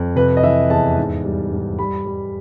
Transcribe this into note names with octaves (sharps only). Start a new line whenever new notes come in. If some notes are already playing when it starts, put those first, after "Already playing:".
Already playing: F2
C3 B4
D#5
E3 E5
E2 A5
G#2
G3
G#2
G3 B5
G3